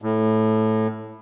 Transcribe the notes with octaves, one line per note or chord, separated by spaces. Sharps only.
A2